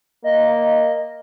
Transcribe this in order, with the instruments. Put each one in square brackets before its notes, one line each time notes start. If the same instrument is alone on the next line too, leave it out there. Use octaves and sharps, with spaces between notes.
[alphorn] A#3 [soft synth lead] D#5